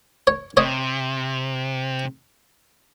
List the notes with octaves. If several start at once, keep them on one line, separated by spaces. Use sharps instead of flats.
C#5
C3 C#5 D#5